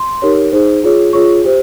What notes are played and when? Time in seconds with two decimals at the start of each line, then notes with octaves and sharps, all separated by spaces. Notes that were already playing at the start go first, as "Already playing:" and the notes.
Already playing: C6
0.22 D#4 G4 A#4 C#5
0.52 D#4 G#4 C5
0.84 F4 G#4 C#5
1.13 F4 G#4 C#5 C#6
1.44 G4 C5